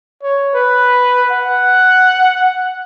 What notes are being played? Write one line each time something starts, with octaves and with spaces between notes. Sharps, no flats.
C#5
B4
F#5